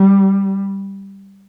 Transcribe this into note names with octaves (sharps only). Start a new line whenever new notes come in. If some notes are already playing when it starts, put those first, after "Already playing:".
Already playing: G3